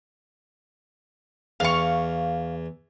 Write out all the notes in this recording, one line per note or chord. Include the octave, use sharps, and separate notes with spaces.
E2 F5 C#6